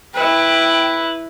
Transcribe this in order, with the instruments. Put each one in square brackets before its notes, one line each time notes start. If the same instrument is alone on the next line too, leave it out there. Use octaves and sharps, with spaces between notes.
[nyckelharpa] E4 B4 [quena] G5